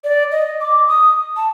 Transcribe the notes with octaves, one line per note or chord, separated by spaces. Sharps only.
D5
D#5
D6
D#6
A5